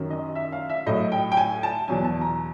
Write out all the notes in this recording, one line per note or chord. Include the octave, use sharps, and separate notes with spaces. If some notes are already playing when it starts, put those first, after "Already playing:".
Already playing: F#2 D#3 F#3
D#5
E5
F5
E5
A2 F#3 D#5
G5
G5
G#5
A5
E2 B2 F#3 G#5
A5
A#5